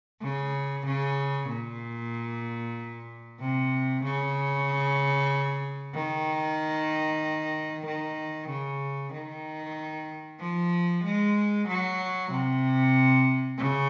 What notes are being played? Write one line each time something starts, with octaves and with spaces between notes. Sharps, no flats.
C#3
C#3
A#2
C3
C#3
D#3
D#3
C#3
D#3
F3
G#3
F#3
C3
C#3